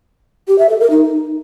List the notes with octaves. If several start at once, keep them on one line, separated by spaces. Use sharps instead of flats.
G4
E5
A4
A#4
D#4